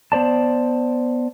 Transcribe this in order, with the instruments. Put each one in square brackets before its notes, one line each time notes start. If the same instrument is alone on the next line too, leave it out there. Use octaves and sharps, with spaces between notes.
[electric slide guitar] B3 C5 D5 A5